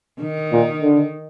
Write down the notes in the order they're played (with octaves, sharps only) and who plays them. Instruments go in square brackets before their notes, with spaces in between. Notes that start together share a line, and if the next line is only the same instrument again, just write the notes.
[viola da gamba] D#3
[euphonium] A#2
D3